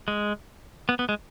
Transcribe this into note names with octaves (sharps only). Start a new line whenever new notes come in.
G#3
B3
B3
G#3